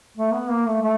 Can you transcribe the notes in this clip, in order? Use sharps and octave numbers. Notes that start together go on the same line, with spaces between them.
A3
B3
A#3
A3
A3